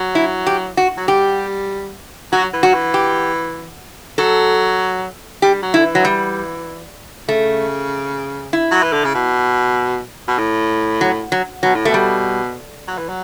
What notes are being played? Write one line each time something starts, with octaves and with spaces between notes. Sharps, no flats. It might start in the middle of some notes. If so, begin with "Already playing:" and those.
Already playing: F#3
E4
G4
F#4
F#3
G3 G4
F#3 F#4
E3
F#3 F#4
E3
G4
F#3 A4
G3 G4
F#3
D3 E4
E3
F#3
G3
C#3 A3
E4
F#3
E3
D3
C#3
B2
B2
A2
F#3
F#3
B2 F#3
A2
B2 A3
G3
F#3
E3
F#3